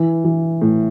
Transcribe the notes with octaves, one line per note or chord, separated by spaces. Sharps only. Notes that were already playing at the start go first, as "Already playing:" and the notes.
Already playing: E3
E3
A2